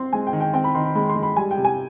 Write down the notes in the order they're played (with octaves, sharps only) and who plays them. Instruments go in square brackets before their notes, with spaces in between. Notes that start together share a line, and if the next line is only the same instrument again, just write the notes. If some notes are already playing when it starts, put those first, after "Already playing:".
Already playing: [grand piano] C4 [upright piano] C6
[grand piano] G#3 [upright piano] G#5
[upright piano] G5
[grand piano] D#3
[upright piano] G5
[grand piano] C4 [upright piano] G5
[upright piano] B5
[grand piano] D#3 [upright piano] C6
[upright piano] B5
[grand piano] G#3 [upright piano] B5
[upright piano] C6
[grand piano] G#3
[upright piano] B5
[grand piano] G3 [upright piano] G#5
[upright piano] G5
[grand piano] C3
[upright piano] G#5